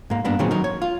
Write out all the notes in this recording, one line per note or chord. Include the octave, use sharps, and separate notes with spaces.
G#2 A#3
G2 A#3 B3 D4
A#2 D#3 F#3 G#3 C4
F#3 D#4 A#4
C#5
F4